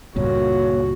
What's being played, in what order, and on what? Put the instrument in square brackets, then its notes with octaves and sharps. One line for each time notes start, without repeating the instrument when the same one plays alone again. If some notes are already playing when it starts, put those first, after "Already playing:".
[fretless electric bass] C#2 G2 A#2 [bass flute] A#3 [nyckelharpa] F#4 [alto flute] C#5